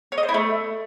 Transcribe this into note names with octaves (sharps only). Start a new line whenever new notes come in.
C#5
D#5
C5
E4
A3